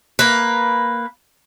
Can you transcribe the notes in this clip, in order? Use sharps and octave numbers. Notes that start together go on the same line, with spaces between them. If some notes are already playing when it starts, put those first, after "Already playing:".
A#3 B4